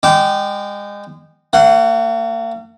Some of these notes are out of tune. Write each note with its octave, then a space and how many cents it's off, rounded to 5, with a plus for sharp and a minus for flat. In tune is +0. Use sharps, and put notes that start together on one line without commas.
G#3 -30 G5 -20 D6 +0
A#3 -45 F#5 +20